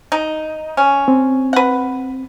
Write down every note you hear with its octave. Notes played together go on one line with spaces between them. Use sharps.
D#4
C#4
C4
B4 F#5